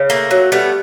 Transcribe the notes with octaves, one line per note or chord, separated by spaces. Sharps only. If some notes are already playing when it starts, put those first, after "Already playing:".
Already playing: C#3
A3 A#3
F#3
G3 A3 B3